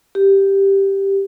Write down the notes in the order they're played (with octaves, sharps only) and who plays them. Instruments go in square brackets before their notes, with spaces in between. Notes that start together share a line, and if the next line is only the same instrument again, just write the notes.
[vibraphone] G4